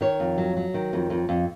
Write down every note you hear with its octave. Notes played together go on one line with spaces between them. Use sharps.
D#3 C#5
F2
F#3
F#3
D#3
F2
F2
F2